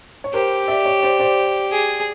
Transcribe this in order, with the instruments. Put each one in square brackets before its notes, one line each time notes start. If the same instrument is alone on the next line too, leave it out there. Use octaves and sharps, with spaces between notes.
[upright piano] C#5
[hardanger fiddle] G4 [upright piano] A#4 C5
[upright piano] D5 E5
C#5 D#5
C5 D5
C5 D5
[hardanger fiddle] G#4